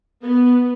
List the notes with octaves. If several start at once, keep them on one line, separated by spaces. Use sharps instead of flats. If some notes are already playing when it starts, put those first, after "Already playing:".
B3